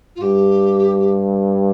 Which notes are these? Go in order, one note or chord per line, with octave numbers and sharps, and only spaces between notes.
F4
G2 G4